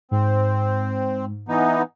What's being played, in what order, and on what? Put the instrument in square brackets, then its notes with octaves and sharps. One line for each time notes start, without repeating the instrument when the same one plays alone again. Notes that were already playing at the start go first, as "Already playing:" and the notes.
[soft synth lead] G#2 [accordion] C4
[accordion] E3 B3 D#4